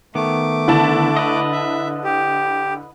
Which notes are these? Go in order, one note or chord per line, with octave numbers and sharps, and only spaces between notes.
D#3 A3 B3 D6
D3 E4 A5
B4 D#5
E5
G4